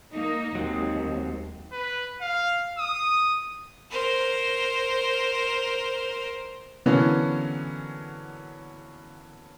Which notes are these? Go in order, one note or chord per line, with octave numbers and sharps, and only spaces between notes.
A#3 D#4
D#2 F#3 G#3 C4
B4
F5
D#6
A#4 C5
D3 E3 F#3 A#3 B3 C#4